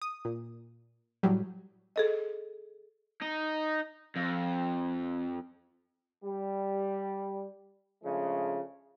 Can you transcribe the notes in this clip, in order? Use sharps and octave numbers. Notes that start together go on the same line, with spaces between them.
D#6
A#2
A2 F#3 G3
G#4 A4 D#5
D#4
F2
G3
C#3 F3 G#3 A3 D4